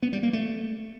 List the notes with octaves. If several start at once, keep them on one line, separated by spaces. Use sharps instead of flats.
B3
G3
A#3
A3